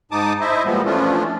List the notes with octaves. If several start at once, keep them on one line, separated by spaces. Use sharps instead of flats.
G#2 D#4 A5 D6 D#6
E4 C5 D#5 E5
A#2 F3 G3 G#3 B3
E3 F3 A3 C#4 D4 F4